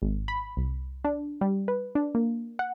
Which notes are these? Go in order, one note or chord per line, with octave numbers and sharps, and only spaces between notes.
G#1
B5
C2
D4
G3
B4
D4
A#3
F#5